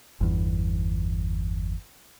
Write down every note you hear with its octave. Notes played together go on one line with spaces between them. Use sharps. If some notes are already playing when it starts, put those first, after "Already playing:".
G1 E2